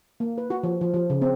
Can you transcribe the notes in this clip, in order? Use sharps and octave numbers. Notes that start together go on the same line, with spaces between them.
A#3
B4
F#4
F3
F3
F3
C#3
C4